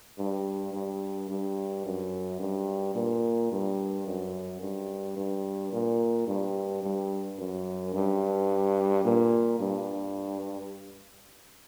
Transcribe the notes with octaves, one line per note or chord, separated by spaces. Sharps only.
G2
G2
G2
F#2
G2
A#2
G2
F#2
G2
G2
A#2
G2
G2
F#2
G2
A#2
G2